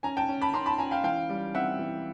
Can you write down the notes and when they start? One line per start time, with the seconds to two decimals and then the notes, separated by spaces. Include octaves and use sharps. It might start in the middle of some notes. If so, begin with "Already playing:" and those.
0.03 C#4 G#5 A#5
0.17 G5 A5
0.28 C#4
0.42 A5 B5
0.53 C#4 A#5 C6
0.66 A5 B5
0.78 C#4 G#5 A#5
0.91 F5 G5
1.04 E3 F5 G5
1.29 G3
1.55 C4 E5 F#5
1.79 E3